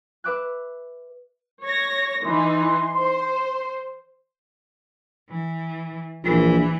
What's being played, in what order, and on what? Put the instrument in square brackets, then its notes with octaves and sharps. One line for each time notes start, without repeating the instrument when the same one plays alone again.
[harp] B4 E5 D6 F#6
[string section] C#5 A#6
[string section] E3 D#4 [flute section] C6
[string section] C5
[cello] E3
[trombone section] A#1 [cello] E3